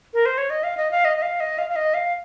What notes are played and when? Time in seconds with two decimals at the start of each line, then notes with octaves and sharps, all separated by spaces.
0.14 A#4
0.26 C5
0.38 C#5
0.50 D#5
0.63 F5
0.77 D#5
0.91 F5
1.05 D#5
1.17 D#5
1.22 F5
1.40 D#5
1.58 F5
1.70 F5
1.76 D#5
1.94 F5